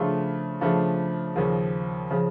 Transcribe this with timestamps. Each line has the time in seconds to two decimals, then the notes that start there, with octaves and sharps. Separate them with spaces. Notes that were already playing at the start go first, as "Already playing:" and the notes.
Already playing: C#3 F3 A3 D4 F4
0.61 C#3 F3 A3 D4 F4
1.36 D#2 C#3 F3
2.10 C#3 F3